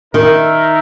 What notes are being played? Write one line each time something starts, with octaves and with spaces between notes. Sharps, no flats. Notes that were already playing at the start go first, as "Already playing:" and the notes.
D#3 D#4 A#4 E5